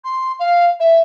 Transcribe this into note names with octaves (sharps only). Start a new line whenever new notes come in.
C6
F5
E5